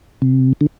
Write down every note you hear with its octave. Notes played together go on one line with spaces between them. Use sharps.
C3
D3